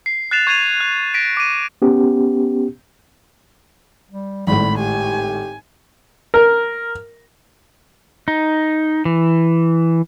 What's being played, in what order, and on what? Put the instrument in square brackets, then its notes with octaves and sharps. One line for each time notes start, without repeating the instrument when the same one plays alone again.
[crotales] C7
F#6 A6 C7 E7 F7
C#6 G#6 C7 D#7 F7
F#6
A#6 B6 D7
D6 D#7
[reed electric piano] B3 C#4 G4
[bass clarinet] G3
[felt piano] G#1 A2 [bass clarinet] G3 [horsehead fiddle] B5
[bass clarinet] G4 [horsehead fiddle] G#5
[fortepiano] A#4
[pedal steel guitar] D#4
E3